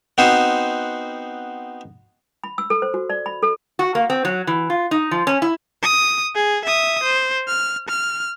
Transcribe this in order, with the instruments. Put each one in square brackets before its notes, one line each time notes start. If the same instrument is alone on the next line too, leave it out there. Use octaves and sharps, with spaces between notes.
[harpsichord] B3 C4 D#4 F#4 C5
[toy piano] B5
E6
A4
C5
F#4
D5
B5
A4
[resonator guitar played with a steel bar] F#4
A#3
C4
F#3
E3
F4
D#4
F3
C#4
E4
[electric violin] D#6
G#4
E5 D#6
C5
F6
F6